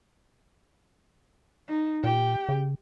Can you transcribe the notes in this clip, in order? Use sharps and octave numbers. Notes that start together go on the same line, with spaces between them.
D#4
A#2 G4 G5
C#3